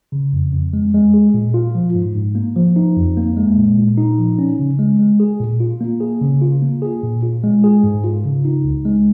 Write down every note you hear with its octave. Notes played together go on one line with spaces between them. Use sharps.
C#3
F2
F2
G#3
G#3
G#4
A#2
F4
F3
G#2
G#2
A#3
F3
D#4
F2
A#3
G#3
A#2
A#2
D#4
F3
C#4
C#3
G#3
G#3
G#4
A#2
F4
A#3
G#4
C#3
F4
A#3
G#4
A#2
F4
G#3
G#4
G#2
F4
C#3
D#4
C#2
G#3